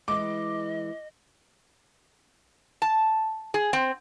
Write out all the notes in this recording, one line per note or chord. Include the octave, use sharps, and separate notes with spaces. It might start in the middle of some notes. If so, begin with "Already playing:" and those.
E3 G#3 D#5 D6
A5
G#4
C4